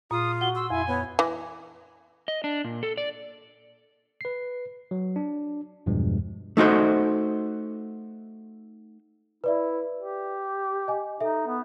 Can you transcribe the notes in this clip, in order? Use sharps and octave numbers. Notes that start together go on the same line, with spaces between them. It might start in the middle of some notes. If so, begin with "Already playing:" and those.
A#2 F4 D#6
F#4 F#5 G7
C6 E6
F2 E4 G#5
B3 C#5
E3
D#5
D4
A#2
A4
D5
B4 C7
F#3
D4
E2 G2 B2 F3 G#3
A3 D#4 F#4 C5
E4 B4 D5 E5
G4
D#5 G#5
D#4 A4 E5
B3